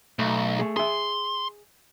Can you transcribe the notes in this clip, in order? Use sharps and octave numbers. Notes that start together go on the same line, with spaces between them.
B1 A3
A3 G#4
G#4 E5 C6